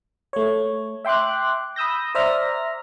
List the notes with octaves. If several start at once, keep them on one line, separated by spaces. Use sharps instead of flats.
A3 C#5
E5 G5 C6 D6 F#6
B5 D#6 E6 G6 A#6
C5 D5 E5 A#5 F6 A#6